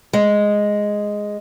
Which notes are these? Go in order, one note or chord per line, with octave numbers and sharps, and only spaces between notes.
G#3